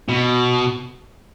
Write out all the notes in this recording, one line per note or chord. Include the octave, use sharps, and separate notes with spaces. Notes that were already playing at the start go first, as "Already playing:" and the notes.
B2